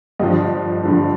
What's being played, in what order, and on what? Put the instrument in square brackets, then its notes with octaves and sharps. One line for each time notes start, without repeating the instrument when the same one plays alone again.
[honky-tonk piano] G2 D3 F3 D#5
G2 D3 F3